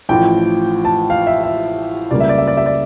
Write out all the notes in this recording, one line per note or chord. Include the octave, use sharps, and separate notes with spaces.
A1 A2 F3 G5
A5
F5
E5
E5
C#2 C#3 G3 A#3 D5
E5
D5
E5
D5
E5
D5